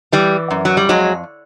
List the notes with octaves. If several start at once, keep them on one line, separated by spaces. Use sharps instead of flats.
E3 G3
F#2
F#3
G3
F2 F#3 G#3